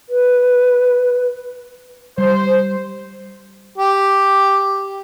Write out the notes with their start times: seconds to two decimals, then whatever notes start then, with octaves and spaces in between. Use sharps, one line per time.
0.09 B4
2.18 G3 C5
3.78 G4